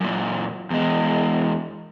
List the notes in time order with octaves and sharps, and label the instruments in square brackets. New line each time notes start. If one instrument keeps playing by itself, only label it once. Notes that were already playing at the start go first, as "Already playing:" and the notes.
[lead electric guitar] F#2 A#2
E2 G#3